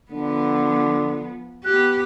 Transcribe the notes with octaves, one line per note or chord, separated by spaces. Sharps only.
D3 F3 B3
B3 G4 F#6